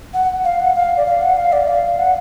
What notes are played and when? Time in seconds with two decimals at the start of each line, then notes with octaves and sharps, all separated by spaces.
0.14 F#5
0.44 F5
0.60 F#5
0.75 F5
0.97 D5
1.06 F5
1.21 F#5
1.37 F5
1.52 D5
1.68 F5
1.99 F#5